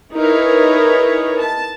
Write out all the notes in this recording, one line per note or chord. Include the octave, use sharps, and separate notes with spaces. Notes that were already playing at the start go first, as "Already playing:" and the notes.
D#4 E4 G#4 A#4 B4 C#5
A5